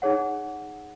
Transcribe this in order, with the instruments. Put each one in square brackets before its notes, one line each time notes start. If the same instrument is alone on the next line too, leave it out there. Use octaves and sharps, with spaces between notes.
[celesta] D#4 G#4 C#5 F#5